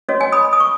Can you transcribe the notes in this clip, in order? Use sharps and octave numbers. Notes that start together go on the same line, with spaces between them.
C#4 F#4 C#5 D#5
D#5 G#5
B5 D#6
D#6
C#6